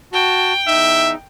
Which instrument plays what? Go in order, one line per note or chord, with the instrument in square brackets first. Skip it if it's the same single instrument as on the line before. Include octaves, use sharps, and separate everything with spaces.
[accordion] F#4 A5 [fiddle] G5
[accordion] E2 D#4 [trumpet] E5